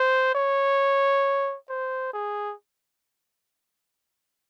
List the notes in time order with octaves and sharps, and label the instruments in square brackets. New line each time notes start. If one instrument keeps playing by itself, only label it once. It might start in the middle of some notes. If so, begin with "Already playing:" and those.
Already playing: [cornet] C5
C#5
C5
G#4